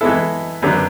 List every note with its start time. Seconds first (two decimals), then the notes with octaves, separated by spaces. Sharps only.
0.01 E3 G#3 B3 E4 A4
0.62 F#2 D3 F#3 B3 D4